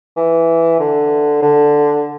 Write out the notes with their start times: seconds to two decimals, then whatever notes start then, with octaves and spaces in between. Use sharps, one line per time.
0.17 E3
0.80 D3
1.42 D3